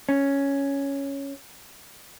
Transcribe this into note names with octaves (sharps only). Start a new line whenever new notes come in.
C#4